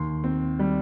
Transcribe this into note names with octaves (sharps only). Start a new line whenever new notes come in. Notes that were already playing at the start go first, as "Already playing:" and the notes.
Already playing: D#2 C6
C4
G3